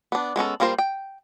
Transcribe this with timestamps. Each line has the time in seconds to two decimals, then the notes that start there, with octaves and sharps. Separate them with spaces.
0.12 B3 D4
0.36 G#3 B3 C#4 A4
0.60 G3 A#3 F4 A#4 C5
0.78 G5